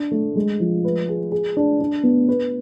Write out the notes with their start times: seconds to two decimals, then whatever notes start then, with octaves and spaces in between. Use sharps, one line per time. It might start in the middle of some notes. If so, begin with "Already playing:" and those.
Already playing: D4
0.11 A3
0.35 G#3
0.60 F3
0.85 B4
1.09 G#4
1.32 G#4
1.57 D4
1.81 D4
2.03 B3
2.29 B4